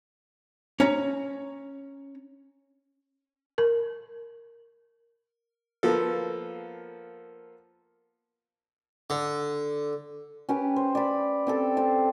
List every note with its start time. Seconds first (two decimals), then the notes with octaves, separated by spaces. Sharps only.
0.80 C#4 C#5 A#5
3.58 A#4
5.83 F3 A#3 B3 A4
9.10 D3
10.49 C#4 G4 B4
10.76 C5
10.95 D5 B5
11.47 C4 G4 A4
11.77 C5 A5